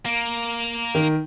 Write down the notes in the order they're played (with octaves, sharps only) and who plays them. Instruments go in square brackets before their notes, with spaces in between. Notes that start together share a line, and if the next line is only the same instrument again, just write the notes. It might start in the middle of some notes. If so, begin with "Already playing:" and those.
[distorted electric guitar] A#3
[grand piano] D#3